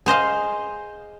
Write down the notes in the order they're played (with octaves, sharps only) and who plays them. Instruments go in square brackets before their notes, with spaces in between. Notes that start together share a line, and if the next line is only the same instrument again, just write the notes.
[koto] G#4 C5 D#5 F5